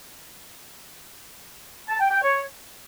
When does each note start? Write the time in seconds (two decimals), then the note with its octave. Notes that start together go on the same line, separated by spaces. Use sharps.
1.89 A5
2.00 G5
2.11 G5
2.22 C#5